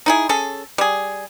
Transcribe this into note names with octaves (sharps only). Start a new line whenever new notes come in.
D#4 E4 G#4
C#4 G#4 A4
G3 G#4